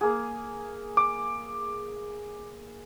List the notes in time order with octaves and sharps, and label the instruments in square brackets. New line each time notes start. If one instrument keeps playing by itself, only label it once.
[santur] A#3 G#4
[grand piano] D6